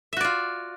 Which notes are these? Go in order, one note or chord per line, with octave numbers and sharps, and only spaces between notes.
F4 F#4 D5 E5